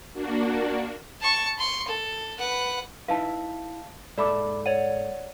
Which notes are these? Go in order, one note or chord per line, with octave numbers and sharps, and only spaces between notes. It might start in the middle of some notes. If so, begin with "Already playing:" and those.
A#3 D4 F#4
A5 C#6
C6 C#6
A4
B4 F#5
D#4 E4 B4 F5 A5
G#2 A4 D5 E5 B5 D6
C#5 D5 F#5 D#7